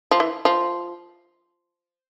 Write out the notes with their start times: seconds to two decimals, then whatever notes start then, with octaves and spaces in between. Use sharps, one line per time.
0.11 F3
0.20 E3
0.45 F3